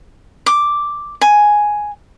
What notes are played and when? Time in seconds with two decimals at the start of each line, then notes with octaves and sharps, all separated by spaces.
0.46 D6
1.21 G#5